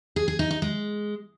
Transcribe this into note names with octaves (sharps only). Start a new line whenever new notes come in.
G#4
G#4
D#4
D#4
G#3